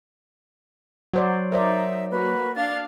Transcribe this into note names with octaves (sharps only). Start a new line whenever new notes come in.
F#3 F#4 C5 D5
D#4 A#4 C5 D5 E5
A#3 F#4 B4
D4 F5 A6